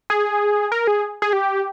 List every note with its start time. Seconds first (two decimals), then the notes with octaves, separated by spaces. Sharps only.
0.10 G#4
0.72 A#4
0.87 G#4
1.22 G#4
1.33 G4